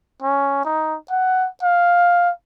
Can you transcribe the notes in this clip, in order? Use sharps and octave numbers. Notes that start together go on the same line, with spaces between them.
C#4
D#4
F#5
F5